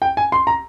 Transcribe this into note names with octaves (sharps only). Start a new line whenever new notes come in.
G5
G#5
C6
A#5